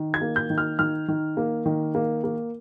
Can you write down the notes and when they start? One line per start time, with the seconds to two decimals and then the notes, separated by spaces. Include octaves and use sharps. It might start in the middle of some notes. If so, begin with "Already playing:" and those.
Already playing: D#3
0.14 G#6
0.21 A#3
0.36 G6
0.50 D#3
0.58 F6
0.79 D#3 F6
1.08 D#3
1.37 A#3
1.66 D#3
1.95 A#3
2.24 A#3